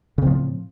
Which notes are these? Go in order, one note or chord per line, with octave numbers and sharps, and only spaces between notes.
A2 C#3 F3 C4